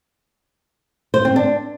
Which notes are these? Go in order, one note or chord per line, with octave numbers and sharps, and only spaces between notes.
C5
C4
D4